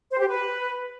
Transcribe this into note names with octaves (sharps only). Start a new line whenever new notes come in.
C5
G4
B4